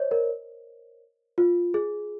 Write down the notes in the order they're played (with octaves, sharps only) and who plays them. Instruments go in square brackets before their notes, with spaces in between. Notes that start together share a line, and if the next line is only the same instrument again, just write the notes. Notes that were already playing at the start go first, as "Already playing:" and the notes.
Already playing: [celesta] C5 C#5 D#5
A#4
F4
G#4